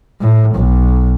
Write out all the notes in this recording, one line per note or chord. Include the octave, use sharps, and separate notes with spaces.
A2
B1